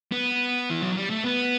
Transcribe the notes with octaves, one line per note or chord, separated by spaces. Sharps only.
B3
E3
F#3
G3
A3
B3